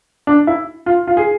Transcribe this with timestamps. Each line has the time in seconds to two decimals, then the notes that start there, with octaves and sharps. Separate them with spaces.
0.27 D4
0.47 E4
0.86 F4
1.07 F4
1.17 G#4